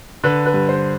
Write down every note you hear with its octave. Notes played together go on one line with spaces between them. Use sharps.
D3 B4
B4
G2
C5